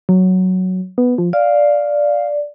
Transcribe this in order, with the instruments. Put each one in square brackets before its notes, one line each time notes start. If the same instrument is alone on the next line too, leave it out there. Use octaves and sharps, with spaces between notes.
[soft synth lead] F#3
B3
F3
[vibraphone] D5 [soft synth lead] F5